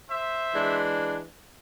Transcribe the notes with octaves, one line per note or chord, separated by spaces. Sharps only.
C5 E5
E3 G#3 D4